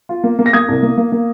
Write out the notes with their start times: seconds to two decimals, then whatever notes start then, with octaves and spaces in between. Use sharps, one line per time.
0.09 F4
0.24 A#3
0.39 A#3
0.46 A#6
0.53 A#3 D#6 G#6
0.68 C2
0.83 A#3
0.98 A#3
1.12 A#3